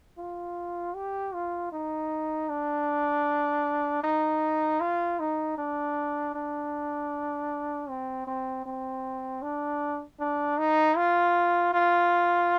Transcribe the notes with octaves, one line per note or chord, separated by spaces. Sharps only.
F4
G4
F4
D#4
D4
D#4
F4
D#4
D4
D4
C4
C4
C4
D4
D4
D#4
F4
F4